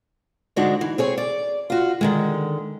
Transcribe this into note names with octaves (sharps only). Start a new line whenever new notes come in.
G#2 D3 G#3 D4 D#4 F#4
E3
C4 G#4 C#5
D5
F4 F#4
D3 D#3 G#3